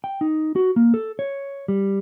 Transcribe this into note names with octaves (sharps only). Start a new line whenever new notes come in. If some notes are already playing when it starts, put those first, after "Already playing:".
G5
D#4
F#4
A#3
A4
C#5
G3